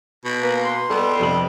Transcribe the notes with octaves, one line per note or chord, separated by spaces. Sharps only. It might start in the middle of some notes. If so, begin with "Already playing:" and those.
B2
A#3 B4
C6
B2 G3 B3 A4
F2 C3 F#7